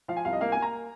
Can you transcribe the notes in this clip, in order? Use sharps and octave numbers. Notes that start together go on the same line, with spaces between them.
F3 F5
G#5
C2 F5
D#5
A#3 F5
A#3 G#5
A#5